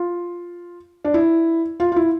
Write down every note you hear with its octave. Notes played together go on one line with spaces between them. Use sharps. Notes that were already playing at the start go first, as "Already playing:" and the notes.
Already playing: F4
D4
E4
F4
F4
E4